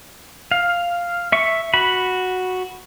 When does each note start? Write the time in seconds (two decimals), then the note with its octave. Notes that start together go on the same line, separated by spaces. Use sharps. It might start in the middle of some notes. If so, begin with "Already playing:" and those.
0.51 F5
1.32 E5 C#6
1.74 F#4 B5